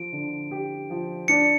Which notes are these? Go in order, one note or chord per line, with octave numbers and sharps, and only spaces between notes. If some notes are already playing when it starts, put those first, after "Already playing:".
Already playing: F3 D7
D3
G4
F3
D4 C#7